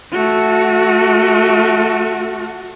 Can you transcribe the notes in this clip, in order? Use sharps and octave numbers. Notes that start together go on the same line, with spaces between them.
A3 F#4